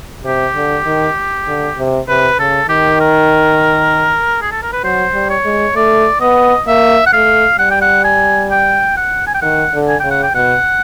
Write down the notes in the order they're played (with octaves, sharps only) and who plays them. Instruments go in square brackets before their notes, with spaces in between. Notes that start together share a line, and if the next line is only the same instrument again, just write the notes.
[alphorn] C3 [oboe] G4
[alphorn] D3
D#3
D3
C3
[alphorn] C3 [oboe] B4
[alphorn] C#3 [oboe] A4
[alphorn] D#3 [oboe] G4
[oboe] A#4
G#4
A4
A#4
B4
[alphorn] F#3 [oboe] C5
[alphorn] G3
[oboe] C#5
[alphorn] G#3
[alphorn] A3 [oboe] D5
[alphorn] B3 [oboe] D#5
[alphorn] A#3 [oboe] E5
[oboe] F#5
[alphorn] A3 [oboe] F5
[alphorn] G3 [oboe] F#5
[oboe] G5
F#5
G#5
G5
F#5
G#5
G5
[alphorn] D#3 [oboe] F#5
[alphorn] D3
[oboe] G#5
[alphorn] C#3 [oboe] G5
[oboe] F#5
G5
[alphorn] B2 [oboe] F#5